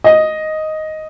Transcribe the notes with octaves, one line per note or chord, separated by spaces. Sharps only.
D#5